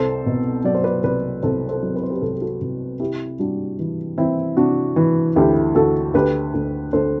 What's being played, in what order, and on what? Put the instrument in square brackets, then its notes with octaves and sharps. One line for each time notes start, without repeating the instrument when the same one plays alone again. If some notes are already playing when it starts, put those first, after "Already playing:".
Already playing: [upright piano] C2 A4 C5
B2
F#3 D5
C5
B4 D5
C2 B4 D5
C2 A4 C5
A4 C5
F#3
B4
C5
G4 B4
C2 A4
G4
F#4 A4
C2
C3 E4 G4
G3 D4 F#4
E3
E3 C4 E4
C3 D4 F#4
E3
D2 E4 G4
D2 F#4 A4
D2 G4 B4
D2
D2 A4 C5